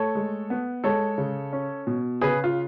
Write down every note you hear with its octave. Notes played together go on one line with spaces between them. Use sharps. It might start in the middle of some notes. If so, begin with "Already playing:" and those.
Already playing: A3 A4 C#5
G#3
B3
G#3 A4 C#5
C#3
C#4
B2
C#3 G#4 B4
F4